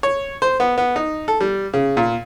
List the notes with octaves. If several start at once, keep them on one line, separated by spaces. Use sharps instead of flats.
C#5
C5
B3
B3
D#4
A4
G3
C#3
A#2